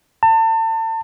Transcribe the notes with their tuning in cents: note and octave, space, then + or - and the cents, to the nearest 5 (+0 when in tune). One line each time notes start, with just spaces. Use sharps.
A5 +35